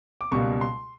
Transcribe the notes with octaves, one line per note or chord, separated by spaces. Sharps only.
D6
C#2 B2 G3 A#3 C#6
C6